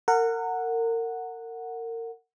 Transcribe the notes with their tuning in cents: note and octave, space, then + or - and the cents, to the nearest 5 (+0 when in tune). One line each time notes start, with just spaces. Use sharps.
A#4 -30 F#5 -5